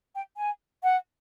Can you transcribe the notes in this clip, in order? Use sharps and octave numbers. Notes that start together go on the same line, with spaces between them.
G5
G#5
F#5